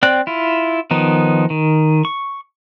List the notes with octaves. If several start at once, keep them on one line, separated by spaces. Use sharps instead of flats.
C4 D5 G5 F#6
E4 F4
D#3 F3 B3 D#4
D#3
C#6